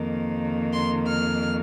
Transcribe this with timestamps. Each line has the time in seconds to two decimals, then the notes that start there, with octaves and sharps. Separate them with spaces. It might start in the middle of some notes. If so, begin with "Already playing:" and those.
Already playing: F2 D#3 A#3
0.73 C6
1.07 F6